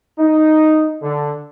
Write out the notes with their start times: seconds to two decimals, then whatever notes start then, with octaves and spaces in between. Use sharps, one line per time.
0.18 D#4
1.02 D3